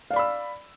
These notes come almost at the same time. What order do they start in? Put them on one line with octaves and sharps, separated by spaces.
F5 D5 B5 E6